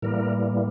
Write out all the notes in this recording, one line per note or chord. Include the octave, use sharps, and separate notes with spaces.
A2 E3 G3 A#3 A#4